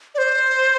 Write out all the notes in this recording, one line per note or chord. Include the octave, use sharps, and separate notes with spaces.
D5
C5